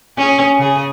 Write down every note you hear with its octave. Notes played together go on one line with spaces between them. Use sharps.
C#4 G#4
C#3 G#4